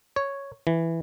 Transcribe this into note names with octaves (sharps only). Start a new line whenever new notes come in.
C#5
E3